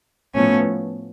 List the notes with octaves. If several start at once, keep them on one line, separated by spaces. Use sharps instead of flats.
A2 F3 A3 B3 C#4